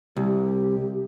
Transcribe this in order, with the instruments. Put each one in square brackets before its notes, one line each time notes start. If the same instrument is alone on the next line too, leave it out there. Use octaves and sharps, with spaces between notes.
[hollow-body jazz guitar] C2 [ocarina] G4